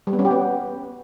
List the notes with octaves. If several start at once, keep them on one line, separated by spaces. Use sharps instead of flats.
G3
B3
C#4
G4
B3